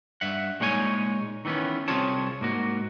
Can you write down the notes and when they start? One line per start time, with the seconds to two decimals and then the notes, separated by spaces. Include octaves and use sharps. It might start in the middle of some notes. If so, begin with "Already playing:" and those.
0.21 G2 E5 F#5
0.60 A#2 G#3 D#4 C#5 G5 G#5
1.45 D#3 E3 A3 B3 C#4
1.88 C2 C4 F4 G#4 C#5 A5
2.41 G#2 A#3 F#4